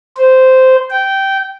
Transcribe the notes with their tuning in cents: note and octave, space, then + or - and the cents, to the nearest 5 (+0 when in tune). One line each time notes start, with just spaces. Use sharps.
C5 -10
G5 -15